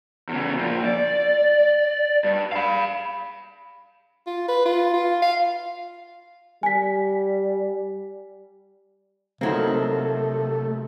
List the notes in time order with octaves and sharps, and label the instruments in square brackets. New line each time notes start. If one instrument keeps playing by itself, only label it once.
[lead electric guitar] E2 C#3
A#2 F3
D5
G2
F5 B5
[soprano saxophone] F4
B4
F4
F4
F5
[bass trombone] G3 [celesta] G#5 B6
[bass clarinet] C3 [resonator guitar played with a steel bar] F3 F#3 A#3 [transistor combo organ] A3 [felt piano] C4 D#4